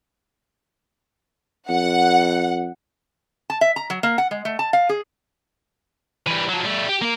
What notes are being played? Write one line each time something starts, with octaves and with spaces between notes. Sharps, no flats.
F2 F#5
A5
E5
A#5
F#3
A#3
F#5
G#3
A3
A5
F5
G#4
E3 G3
F3 F#3
G3 A3
G4
A#3 A#4